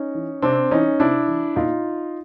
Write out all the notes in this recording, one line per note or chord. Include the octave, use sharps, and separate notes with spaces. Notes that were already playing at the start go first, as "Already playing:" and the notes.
Already playing: C#4 D#4
E3
C3 C4 D4
E3 C#4 D#4
C3 D4 E4
E3
A#2 D#4 F4